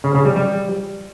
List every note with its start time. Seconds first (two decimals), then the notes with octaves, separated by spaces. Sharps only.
0.04 C#3
0.15 C#3
0.25 G3
0.36 G3